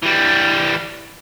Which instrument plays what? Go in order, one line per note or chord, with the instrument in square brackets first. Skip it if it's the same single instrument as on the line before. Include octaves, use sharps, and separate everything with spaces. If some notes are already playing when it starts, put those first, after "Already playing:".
[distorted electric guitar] E3 G3